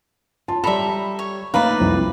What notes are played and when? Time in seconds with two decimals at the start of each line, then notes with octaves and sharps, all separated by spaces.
0.48 F4 A5
0.64 G3 A4 D5 E5 A#5 B5
1.19 C#5
1.54 A3 A#3 D#4 B4 D5 F5 A#5 B5
1.80 C2 F2